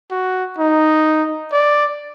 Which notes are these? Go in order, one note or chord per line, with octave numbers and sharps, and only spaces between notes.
F#4
D#4
D5